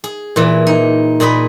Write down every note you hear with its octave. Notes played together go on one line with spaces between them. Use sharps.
G#4
A#2 E3
D#4
A#2 G#4 D#5 B5